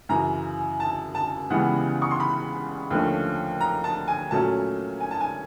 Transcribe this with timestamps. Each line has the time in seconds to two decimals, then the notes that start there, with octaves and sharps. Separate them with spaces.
0.09 F#2 C#3 E3 A#5
0.80 A5
1.15 A5
1.50 C#2 C#3 E3 G3 B3 F#5
2.02 C#6
2.11 C6
2.20 B5
2.91 D#2 D3 F3 A3 C#4
3.61 A#5
3.84 A5
4.08 G#5
4.31 A#2 F#3 A3 C#4 A5
5.00 G#5
5.11 A5
5.21 G#5